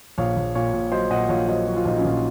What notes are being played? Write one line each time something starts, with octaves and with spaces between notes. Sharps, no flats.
A#1 C#5 F5
A#1
A#2 C#5 F5
A#2
F#3 C5 D#5
A#2 D#5 F#5
A#1 C#5 F5
F#3 C5 D#5
F#3 F#4
F4
A#1 D#4
C#4 F4
A#1